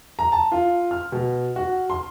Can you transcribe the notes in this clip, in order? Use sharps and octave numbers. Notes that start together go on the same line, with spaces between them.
A#5
A5
F4
F6
B2
F#4
C6